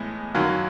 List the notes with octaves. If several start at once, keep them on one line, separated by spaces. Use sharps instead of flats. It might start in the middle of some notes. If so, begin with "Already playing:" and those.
Already playing: A2 E3 G#3 B3
F#2 D#3 F#3 A#3